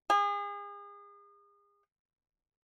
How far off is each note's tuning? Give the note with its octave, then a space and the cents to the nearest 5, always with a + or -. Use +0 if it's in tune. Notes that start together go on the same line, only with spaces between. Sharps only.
G#4 -35